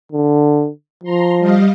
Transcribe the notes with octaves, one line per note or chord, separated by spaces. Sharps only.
D3
F3 A#5 C6
G3 D#5 F5